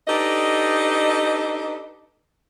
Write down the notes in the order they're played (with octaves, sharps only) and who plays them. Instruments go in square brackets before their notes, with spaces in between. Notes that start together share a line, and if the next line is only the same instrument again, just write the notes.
[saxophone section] D4 D#4 G4 A4 B4 D#5